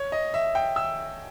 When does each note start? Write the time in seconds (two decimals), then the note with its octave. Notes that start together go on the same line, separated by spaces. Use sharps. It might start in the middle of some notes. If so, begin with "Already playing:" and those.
Already playing: C#5
0.12 D#5
0.34 E5
0.55 G5
0.76 E6